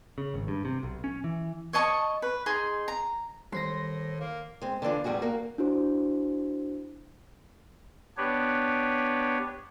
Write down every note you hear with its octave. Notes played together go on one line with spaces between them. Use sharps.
C#3
G#1
G2
C3
B1
C#4
E3
C#5 D#5 A5 C#6
B4
D#4 G#4 C6
A#5
A2 D#3 G3 C5 C6 A#6
A#3
G#3 C4
D3 E3 D4 F4
E2 A2 G3 F#4 G#4
A#3 F#4
D4 E4 F#4 C5
B3 D4 G4 B4 C#5